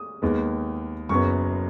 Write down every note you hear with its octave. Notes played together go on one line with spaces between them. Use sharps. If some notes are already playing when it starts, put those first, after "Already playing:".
Already playing: D#6
D#2 D#3 G#3 B3
F#1 F#2 F#3 B3 C#6